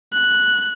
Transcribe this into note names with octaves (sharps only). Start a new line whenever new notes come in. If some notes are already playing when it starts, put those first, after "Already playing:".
F#6